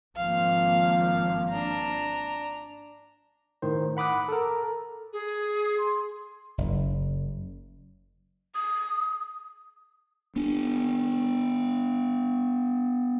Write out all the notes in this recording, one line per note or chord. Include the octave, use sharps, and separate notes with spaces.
G#1 F3 A#3 F5
D4 A#5
A2 D#3 C5
F#5 B5 D6 D#6 F#6
A4 A#4
G#4
C6
F#1
D#6
B3 D4